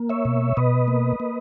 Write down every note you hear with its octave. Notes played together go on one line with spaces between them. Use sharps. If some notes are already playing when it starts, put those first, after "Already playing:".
Already playing: A#3
C#5 E5
B2
B2 B4 D#5
A#3
A#3